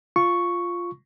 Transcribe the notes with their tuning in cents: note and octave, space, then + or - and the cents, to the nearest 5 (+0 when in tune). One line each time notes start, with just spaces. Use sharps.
F4 +0 C#6 +0